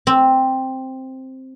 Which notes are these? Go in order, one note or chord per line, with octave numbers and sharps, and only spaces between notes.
C4